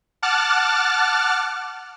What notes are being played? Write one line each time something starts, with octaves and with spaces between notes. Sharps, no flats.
F#5 A5 D6 F6 F#6 A6